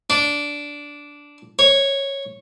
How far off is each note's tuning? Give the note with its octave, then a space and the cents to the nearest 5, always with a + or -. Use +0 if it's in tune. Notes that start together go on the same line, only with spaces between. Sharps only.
D4 -10
C#5 -10